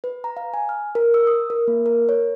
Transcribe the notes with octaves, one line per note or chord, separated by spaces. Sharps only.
B4
A#5
F5
G#5
F6
A#4
E6
D#6
A#4
A#3
A#4
C#5